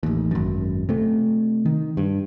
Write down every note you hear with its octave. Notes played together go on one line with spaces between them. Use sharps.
A1 D#2
G#1 F#2
C3 A3
D#3
G2